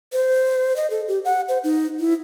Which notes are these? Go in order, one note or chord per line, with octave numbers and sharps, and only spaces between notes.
C5
D#5
A4
G4
F#5
C5
D#4
E4